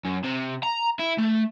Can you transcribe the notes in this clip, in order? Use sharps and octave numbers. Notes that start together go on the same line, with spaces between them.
F#2
C3
A#5
E4
A3